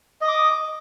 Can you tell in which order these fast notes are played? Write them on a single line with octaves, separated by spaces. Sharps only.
D#5 D#6 D6